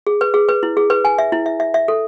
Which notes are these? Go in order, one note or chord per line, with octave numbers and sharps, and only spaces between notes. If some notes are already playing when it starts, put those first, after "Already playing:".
G#4
B4
G#4
B4
E4
G#4
B4
G#5
E5
E4
E5
E5
E5
A4